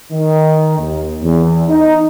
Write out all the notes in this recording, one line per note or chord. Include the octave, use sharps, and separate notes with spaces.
D#3
D#2
E2
D#4